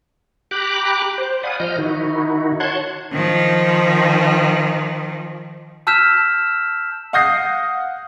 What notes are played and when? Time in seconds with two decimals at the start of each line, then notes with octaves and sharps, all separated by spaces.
0.51 G4 G5 A#5 B5 D6 F#6
1.18 C5
1.43 D5 F5 F#5 G#5 B5 D#6
1.60 F3 D#5 F6 G6
1.78 D#3 D#4 E4 F#4
2.60 C#5 F#5 A5 C6 F#6 G#6
3.13 D#3 F3
5.87 A5 E6 F6 G6 B6 E7
7.13 F5 F#5 D#6 G6 A#6 C7